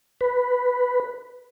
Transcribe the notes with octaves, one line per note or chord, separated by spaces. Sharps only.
B4